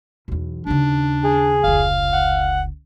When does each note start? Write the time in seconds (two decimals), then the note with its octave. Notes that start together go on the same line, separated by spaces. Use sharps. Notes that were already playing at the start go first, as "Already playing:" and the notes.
0.28 B1 E2
0.67 D#2 C#3 D4
1.24 G#4
1.64 F1 C#2 F5
2.13 F#5